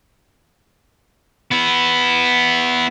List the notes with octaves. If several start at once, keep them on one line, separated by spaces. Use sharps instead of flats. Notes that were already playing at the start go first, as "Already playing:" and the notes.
B3 E4